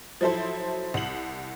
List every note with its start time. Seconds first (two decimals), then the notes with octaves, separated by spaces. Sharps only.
0.21 F3 F#3 E4 A4 C5
0.94 C2 F#7